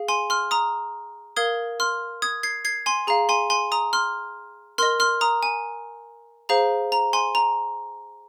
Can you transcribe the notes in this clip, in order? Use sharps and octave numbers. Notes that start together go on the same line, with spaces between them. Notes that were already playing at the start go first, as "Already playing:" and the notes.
Already playing: G#4 F5
G#5 C6
C6 F6
A#5 D#6
A#4 F5 D#6 G#6
C6 F6
D#6 G#6
G#6 C7
G#6 C7
G#5 C6
G#4 F5 A#5
G#5 C6
G#5 C6
A#5 D#6
C6 F6
A#4 D#5 C6 F6
C6 F6
A#5 D#6
G#5
G#4 C5 F5 A#5
A#5
G#5 C6
A#5